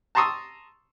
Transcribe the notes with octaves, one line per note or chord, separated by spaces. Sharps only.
A5 A#5 C6 C#6 D#6 E6